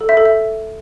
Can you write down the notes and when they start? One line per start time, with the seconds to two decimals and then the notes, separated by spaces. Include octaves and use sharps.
0.01 A4
0.09 E5
0.17 A4
0.25 E5